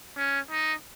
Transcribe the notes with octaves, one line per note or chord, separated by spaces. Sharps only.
C#4
D#4